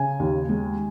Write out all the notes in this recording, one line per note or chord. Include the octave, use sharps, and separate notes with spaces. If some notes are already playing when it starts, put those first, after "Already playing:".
Already playing: C#3 G#5
D#2
G#3